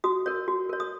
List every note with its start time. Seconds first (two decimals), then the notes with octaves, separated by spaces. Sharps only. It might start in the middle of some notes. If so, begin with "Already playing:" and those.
0.04 F#4 D#6
0.26 A#4 C#5
0.48 F#4
0.69 A#4 C#5
0.80 D#6